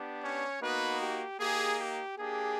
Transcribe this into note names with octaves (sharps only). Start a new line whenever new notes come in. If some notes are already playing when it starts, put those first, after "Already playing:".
Already playing: B3 D4 G4
C#4 C#5
A#3 B3 D#4 F#4 B4
G4
A#3 D#4 G4 G#4
G4
A#3 D4 G4 G#4